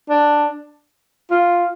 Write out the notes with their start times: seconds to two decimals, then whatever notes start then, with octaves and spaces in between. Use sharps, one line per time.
0.10 D4
1.30 F4